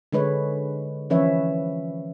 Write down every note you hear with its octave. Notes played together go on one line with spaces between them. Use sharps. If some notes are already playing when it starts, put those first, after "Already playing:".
D3 G#3 B4 C#5
E3 F3 C#4 B4 C#5 E5